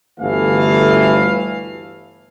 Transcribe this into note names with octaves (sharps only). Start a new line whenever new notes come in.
G1 D2 E3 A3 F5